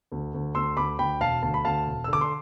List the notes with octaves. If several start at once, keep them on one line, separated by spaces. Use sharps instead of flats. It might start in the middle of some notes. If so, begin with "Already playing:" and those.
D2
D2
D2 C6 E6
D2 B5 D6
D2 G5 B5
E1 F5 A5
D2 A5
B5
D2 F5 A5
E1
E6
D3 D6
C6